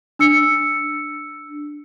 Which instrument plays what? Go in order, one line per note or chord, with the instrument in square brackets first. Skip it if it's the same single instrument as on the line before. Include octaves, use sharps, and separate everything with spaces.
[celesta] D4 E6 C#7